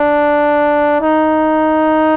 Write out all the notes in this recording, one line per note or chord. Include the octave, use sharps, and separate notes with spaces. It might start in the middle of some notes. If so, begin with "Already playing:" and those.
Already playing: D4
D#4